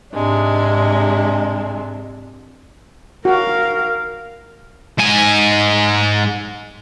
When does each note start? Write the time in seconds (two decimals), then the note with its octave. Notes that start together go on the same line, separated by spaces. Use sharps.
0.12 G#2 C3 G#3 D4
3.25 F#4 A#4 F5
4.99 G#2 G#5